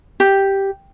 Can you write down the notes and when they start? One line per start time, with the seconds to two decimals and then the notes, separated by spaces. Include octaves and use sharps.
0.20 G4